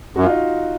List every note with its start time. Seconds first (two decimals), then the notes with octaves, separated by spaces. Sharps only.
0.16 F#2 F#4
0.23 F4
0.30 D#4